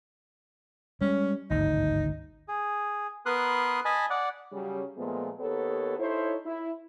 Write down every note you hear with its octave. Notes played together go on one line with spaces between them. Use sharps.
G3 G#3 C#4
G#1 D2 G2 D#4
G#4
B3 A#4 B4 C6 D#6 F#6
D#5 G#5 A5 B5
D5 F#5
C#3 F#3 G3
A#2 F3 G#3 A3 B3
D#2 B3 G4 A4 A#4 C#5
D#4 E4 A4 C5 C#5
E4